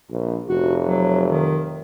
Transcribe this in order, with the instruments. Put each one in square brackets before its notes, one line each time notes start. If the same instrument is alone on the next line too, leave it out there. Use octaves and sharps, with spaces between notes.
[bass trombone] A#1
[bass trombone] F1 [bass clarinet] F#4
[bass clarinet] F#3
D#3